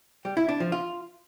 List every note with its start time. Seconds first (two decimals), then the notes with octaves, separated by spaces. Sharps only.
0.25 G3
0.37 E4
0.49 D4
0.60 F3
0.72 F4